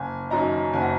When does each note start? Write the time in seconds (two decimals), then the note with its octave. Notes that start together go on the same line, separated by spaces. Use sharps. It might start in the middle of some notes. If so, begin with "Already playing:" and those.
Already playing: F#1 G#5
0.30 F#2 F#3 D#4 A#5
0.73 F#1 G#5
0.81 F#5